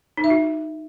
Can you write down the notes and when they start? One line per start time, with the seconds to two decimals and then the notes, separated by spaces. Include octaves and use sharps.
0.17 D#4
0.24 E5
0.30 F#4